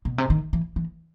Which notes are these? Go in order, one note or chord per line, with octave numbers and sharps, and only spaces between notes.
B2
C3
D#3
E3
E3